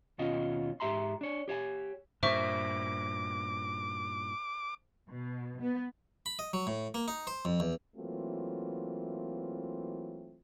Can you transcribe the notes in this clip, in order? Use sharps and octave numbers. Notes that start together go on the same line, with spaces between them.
D#2 B2 C#4 F4 D#5
G#2 G4 E5 A#5 C6
D4 C#5
G4 C#5 E5 G#5
G2 A#2 C5 E5 C#6 D6
B2
B3
B5
D#5
F#3
A2
A#3
D#4
C5
F2
E2
E3 F#3 A3 A#3 C4 F4